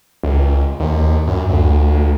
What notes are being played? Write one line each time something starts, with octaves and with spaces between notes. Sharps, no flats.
C#2
D#2
F#2
D2